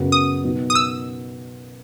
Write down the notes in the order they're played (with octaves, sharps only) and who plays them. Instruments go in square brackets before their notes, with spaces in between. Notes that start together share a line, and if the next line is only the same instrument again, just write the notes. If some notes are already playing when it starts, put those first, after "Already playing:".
Already playing: [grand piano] F#2 C#3 F#3 B3
[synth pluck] D#6
[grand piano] B2 F#3 B3 D#4
[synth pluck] D#6
E6